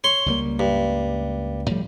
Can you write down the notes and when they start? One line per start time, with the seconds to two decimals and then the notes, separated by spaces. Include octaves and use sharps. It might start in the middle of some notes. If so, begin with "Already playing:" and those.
0.04 C#5 C6
0.26 C#2 G3 A#3
0.59 G2
1.70 A2 F3 G3